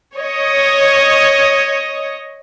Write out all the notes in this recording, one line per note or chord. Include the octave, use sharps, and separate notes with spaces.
C#5 D#5